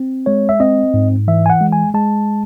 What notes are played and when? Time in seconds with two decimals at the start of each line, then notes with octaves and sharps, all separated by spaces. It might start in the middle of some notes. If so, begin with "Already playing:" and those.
Already playing: C4
0.26 G#3 C#5
0.49 E5
0.60 C4 D#5
0.94 G#2
1.28 E3 E5
1.46 G#5
1.50 F#5
1.61 G#3
1.73 G#5
1.94 G#3 A5